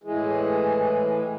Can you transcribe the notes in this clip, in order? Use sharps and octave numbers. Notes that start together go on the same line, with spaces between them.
A2 E3 G#3